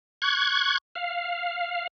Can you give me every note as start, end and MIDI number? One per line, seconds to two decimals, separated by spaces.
0.22 0.78 85
0.22 0.78 90
0.22 0.78 92
0.95 1.87 77